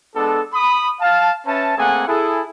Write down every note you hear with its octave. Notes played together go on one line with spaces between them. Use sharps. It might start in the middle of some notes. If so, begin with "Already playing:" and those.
G#3 B3 D4 A4
B5 D#6
F5 A5
C#4 B4 E5 A5
A3 A#3 C4 G#4 F#5 G#5
E4 G#4 A4